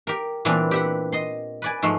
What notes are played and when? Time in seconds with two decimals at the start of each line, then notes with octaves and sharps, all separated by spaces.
0.07 G4 A#4
0.45 A#2 E3 G3 B3 C4 D4
0.71 G4 E5 F#5
1.12 D#5 C6
1.62 B4 D5 G#5
1.82 G#2 F3 F#3 A3